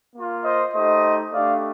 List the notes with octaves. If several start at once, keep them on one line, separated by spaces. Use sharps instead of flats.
A#3 F4
C5 D#5
A3 D#4 G4 C5 D#5
A3 D4 G4 D5 F5